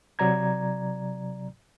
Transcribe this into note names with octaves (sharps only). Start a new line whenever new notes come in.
C3 F#3 D5 A#5 G#6